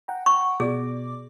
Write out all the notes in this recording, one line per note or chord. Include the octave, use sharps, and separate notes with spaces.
F#5 G5 A#5
C#6
B2 G#4 D5 D6